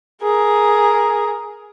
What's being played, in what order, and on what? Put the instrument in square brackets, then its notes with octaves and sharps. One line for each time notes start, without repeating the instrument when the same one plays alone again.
[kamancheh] G#4 A#4